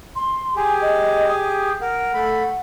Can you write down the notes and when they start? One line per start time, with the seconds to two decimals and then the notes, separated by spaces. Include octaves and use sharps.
0.16 C6
0.56 G4 G#4 G#5
0.82 D#5
1.29 D#6
1.81 A#4 F#5
2.14 A3 B5